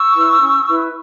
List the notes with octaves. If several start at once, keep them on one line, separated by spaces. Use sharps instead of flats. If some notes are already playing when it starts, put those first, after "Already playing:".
Already playing: C#6 E6
E4 B4
C#4
E4 B4